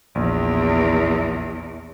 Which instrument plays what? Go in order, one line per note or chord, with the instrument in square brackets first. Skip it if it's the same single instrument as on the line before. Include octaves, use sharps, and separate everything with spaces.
[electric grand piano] A#1 [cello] E2